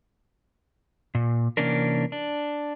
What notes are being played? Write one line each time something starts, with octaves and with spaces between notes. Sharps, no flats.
A#2
C3 E3 A#3 C#4 D4 A#4
D4